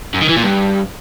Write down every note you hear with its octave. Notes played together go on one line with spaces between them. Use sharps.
F#2
D#3
E3
A#2
G2